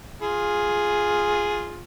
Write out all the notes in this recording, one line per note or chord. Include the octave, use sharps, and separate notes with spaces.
F4 G#4